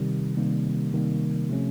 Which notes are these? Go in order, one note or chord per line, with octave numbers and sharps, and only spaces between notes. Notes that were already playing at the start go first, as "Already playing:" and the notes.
Already playing: C3 D#3 G3
C3 D#3 G3 A#3
C3 D#3 G3 A#3
C3 F3 A3 C#4